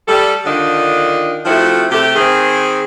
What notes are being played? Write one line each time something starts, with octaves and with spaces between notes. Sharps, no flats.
G3 A4
D3 D#3 D4 F4 D#5
F3 A3 C4 E4 F#4
C3 A3 G4
D#3 C4 G#4